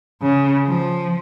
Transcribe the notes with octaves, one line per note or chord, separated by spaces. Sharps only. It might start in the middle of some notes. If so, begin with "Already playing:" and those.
C#3
F3